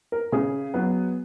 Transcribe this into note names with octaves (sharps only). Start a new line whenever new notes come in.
A#4
C#3 G#4
F#3 B3